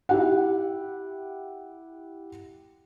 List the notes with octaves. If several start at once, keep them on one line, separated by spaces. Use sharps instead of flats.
E4 G4 F#5